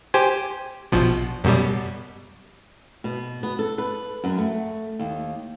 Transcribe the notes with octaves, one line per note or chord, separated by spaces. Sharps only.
G4 C5 G#5
A#1 B2 F3
F#2 B2 G3
B2
B3
A4
B4
F#2
A3
D#2